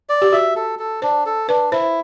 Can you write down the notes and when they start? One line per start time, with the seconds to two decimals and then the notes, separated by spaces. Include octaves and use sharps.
0.09 D5
0.22 G4
0.33 F#4 E5
0.56 A4
0.79 A4
1.02 D4 C5
1.26 A4
1.49 D4 B4
1.72 E4 C5